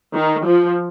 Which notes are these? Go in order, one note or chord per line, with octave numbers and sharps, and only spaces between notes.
D#3
F3